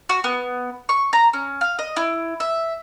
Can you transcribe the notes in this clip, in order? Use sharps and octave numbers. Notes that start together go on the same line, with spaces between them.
F#4
B3
C#6
A#5
C#4
F5
D#5
E4
E5